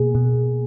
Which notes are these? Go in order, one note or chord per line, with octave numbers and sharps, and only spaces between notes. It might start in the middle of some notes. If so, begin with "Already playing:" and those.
Already playing: B2 A#3 G#4
B2